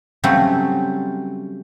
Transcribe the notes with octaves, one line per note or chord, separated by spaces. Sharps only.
C#3 F#3 G3 A3 C4